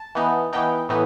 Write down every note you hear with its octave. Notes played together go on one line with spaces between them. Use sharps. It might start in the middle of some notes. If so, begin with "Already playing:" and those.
Already playing: A5
E3 B3 D#4
E3 B3 D#4 G5
A2 E3 B3 D#4